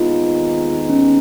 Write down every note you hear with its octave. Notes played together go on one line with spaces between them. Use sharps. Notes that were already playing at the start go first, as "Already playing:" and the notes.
Already playing: D#2 D#3 G#3 B3 D#4 F4
C#4